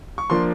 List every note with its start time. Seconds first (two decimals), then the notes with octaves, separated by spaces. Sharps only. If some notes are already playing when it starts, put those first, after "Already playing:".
0.18 C#6
0.30 F3 A#3 D4 C6